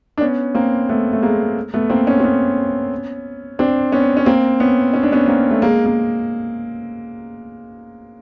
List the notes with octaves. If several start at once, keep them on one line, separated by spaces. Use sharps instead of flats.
D4
B3 C#4
A#3 C4
A3 B3
A3
G#3 A#3
A3 B3
A#3 C4
B3 C#4
C4
B3 C#4
C4 D4
B3 C#4
C#4
A#3 C4
B3 C#4
C#4
D4
B3 C#4
A#3 C4
A3
G#3 A#3
A#3